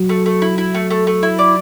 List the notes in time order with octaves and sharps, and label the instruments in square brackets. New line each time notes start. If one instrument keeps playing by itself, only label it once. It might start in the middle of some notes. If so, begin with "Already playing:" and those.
Already playing: [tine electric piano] F#3 F#4
[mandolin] A3
A3
E4
E4
A3
A3
A3
E4
D5